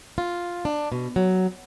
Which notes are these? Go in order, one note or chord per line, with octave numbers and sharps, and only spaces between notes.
F4
D4
B2
F#3